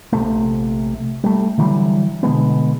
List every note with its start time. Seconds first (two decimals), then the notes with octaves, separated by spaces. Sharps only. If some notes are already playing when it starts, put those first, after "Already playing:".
0.13 A#1 C3 A3
1.24 G3 A3
1.58 D3 E3 F#3 G3
2.23 B2 D3 G#3 B3